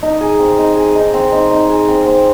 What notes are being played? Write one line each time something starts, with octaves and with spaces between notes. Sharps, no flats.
D#4
G#4
C4
D#4
G#4
D#4
C4
D#4
D#4
G#4
C4
C4